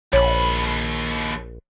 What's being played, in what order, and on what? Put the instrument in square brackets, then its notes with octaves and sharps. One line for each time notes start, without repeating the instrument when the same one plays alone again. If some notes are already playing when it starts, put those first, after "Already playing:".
[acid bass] A#1 [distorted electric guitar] D#2 B5 [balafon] C#5